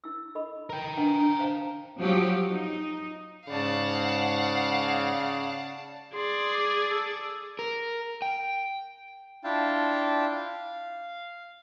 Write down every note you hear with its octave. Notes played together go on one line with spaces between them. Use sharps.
E4 E6
A4 D#5 B5
A#4 G5
D4 B4 F#5
C5 F5 A5
F3 F#3 G4
D#4
G#2 C#3 D5 F5 F#5 A5
G#4 D5 C6
D6
A4
A#4
G5
D4 E4 F4 F5 G5 A5
F5